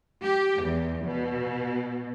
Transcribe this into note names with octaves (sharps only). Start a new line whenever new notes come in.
G4
E2
B2